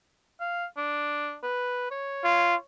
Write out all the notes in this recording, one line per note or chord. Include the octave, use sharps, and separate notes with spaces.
F5
D4
B4
C#5
F4